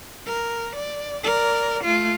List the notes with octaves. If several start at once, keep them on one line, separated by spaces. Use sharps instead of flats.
A#4
D5
A#4 D5
A3 F4